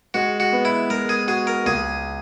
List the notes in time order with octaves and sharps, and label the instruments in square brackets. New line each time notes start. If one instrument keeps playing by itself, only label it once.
[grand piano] G#3 [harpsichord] F#4
[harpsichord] F#4
[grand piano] B3
[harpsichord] E4
[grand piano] G#3 [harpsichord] A#4
[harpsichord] G#4
[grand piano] F#4 [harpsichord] G#4
[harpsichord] A#4
[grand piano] C#2 [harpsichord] G#4